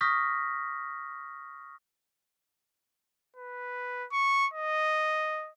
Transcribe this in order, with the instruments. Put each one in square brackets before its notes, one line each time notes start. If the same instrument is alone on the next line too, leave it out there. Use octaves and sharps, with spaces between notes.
[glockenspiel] C#6 D#6 F6 G6 A#6 B6
[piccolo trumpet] B4
C#6
D#5